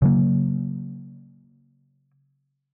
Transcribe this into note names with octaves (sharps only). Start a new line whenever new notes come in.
C#3 F#3 A#3